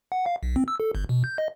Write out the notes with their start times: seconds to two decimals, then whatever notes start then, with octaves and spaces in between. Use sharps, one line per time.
0.12 F#5
0.26 F5
0.43 B1
0.56 C4
0.68 E6
0.80 A4
0.95 G1
1.09 B2
1.24 G6
1.38 D#5